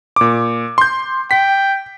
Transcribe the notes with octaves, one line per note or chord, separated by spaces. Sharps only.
A#2 D6
C6 G6
G5 B6